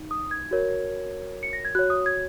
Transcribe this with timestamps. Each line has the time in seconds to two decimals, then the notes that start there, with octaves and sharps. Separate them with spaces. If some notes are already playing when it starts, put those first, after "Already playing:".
Already playing: D#4
0.11 D#6
0.31 G#6
0.51 F#4 A#4 C#5
1.43 C#7
1.53 A#6
1.65 G#6
1.75 F#4 C#5 F#6
1.90 D#6
2.06 G#6